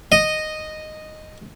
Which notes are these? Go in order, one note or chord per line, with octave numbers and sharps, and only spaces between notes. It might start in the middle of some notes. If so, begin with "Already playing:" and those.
D#5